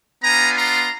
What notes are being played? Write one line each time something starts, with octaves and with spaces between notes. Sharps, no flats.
B3 D4 F4 G#5 A#5
A#5 C6